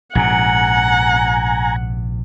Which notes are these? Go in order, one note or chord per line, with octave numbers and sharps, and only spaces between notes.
A#1 G#2 C3 F#5 G#5 A#5